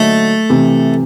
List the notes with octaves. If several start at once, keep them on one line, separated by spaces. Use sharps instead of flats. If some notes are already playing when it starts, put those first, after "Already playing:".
Already playing: D3 F#3 A3 A#3 D#4
C3 E3